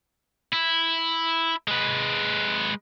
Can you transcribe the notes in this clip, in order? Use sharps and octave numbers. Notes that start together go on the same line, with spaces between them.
E4
G#3 B4